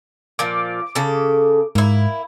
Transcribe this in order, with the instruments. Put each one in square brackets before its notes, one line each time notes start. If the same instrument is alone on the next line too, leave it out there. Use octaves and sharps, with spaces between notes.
[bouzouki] A#2 F3 [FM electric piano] D6
[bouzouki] C#3 A4
[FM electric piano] G#2 [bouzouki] A#3 E4